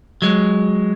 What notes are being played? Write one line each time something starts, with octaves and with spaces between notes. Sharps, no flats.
F#3 G#3